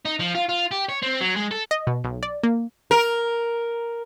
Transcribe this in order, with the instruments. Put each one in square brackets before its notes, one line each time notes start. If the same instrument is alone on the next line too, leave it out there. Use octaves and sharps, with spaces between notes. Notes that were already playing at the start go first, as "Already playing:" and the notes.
[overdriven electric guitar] D#4
F3
F4
F4
G4
C#5
C4
F#3
G#3
A4
[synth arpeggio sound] D#5
B2
B1
D5
A#3
[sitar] A#4